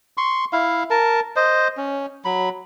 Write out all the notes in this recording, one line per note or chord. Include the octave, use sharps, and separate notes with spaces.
C6 C#6
E4 F5
A#4 A5
C5 D#5
C#4
F#3 B5